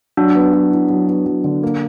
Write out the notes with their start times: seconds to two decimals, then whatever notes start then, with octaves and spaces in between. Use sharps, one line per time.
0.17 F#3 D4
0.35 B3
0.53 F#3
0.72 E4
0.90 F#3
1.09 B3
1.26 F#3
1.44 D3
1.63 A#3